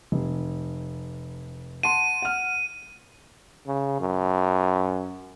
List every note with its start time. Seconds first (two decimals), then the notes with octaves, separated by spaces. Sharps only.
0.12 F1
1.83 F#5 A5 C6 D#7
2.22 F#5 F6
3.67 C#3
4.00 F#2